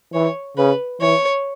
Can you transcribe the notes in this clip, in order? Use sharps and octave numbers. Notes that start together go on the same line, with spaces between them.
E3 C#5
C#3 B4
E3 C#5